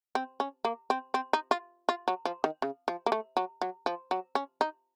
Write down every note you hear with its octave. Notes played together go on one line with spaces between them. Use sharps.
C4
C#4
A#3
C4
C4
D#4
F4
F4
F#3
F3
D#3
C#3
F3
A#3
A3
F#3
F#3
F3
F#3
C#4
D#4